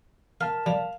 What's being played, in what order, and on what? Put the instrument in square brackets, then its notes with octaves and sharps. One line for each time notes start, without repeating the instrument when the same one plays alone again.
[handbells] A#4 A5 [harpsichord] F5
[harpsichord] G3 [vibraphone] F5